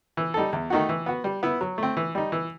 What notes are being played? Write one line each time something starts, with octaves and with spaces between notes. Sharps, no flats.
E3
G3 D#4 A4
E2
D#3 A3 D#4 F#4
E3
B3 F#4
G3
B3 E4
F#3
A3 C4
E3
G3 D#4
E3